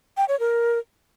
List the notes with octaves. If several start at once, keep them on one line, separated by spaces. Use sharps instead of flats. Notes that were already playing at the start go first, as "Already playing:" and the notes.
G5
C#5
A#4